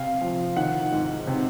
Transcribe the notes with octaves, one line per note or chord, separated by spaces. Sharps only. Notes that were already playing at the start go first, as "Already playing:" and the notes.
Already playing: C3 F5
F3
D#3 F#5
G#2
C3